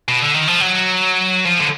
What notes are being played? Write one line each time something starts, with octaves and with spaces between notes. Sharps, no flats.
B2
D3
D#3
F3
F#3
F3
D3